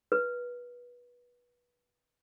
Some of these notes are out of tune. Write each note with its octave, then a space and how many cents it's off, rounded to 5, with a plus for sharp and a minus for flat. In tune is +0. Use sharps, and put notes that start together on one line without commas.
B4 -20